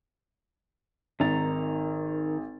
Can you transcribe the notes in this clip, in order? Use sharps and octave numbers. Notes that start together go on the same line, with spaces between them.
G#1 D#3 A#5 A6